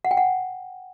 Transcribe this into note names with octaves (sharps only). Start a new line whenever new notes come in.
F#5
G5
F#5